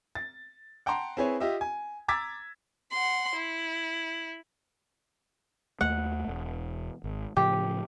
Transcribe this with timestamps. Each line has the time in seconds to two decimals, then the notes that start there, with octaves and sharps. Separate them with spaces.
0.15 A6
0.86 F#5 G5 A5 A#5 C6
1.17 C4 E4 G#4 B4 C#5
1.40 F4 G4 D#5 E5
1.61 G#5
2.08 A#5 D6 E6 G#6 A6 B6
2.91 F#5 C6
3.35 E4
5.81 D#2 A3 F#5
6.28 E1
7.04 G#1
7.37 A2 C#3 F3 G4